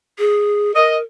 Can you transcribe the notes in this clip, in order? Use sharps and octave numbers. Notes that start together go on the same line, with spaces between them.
G#4
A#4 D#5